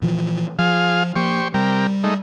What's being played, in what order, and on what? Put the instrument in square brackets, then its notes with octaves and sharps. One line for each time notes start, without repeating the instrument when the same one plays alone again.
[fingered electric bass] A#2 E3 F3
[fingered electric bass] F3 [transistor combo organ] F4 G#4 F5
[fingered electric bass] F3 A#3 [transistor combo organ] G4 C5 C#6
[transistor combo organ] C3 G4 A#4 [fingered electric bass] G3
[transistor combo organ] G#3 A3 D#4